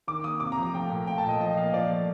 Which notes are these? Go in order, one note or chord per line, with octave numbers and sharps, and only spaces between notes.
D#3 D6
A#3 D#6
C3 D6
A#5
F3
A#5
A3 G5
A#2
A3 G5
A5
A#2 D#5
F3 D#5
A#3 F5
F3 D5
A3